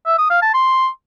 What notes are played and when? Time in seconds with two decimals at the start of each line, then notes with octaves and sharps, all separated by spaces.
0.06 E5
0.18 D#6
0.30 F5
0.42 A5
0.54 C6